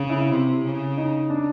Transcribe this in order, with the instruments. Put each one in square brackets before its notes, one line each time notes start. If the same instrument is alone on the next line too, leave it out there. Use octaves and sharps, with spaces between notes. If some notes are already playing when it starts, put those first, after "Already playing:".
Already playing: [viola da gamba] C#3
[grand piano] E4
E4
[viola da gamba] C3
C#3
[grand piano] D#4
D4